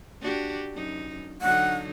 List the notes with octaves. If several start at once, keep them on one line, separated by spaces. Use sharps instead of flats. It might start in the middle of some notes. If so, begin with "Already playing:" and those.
D4 F#4 G4
F#2 D#4
D3 F#3 D#4 F#5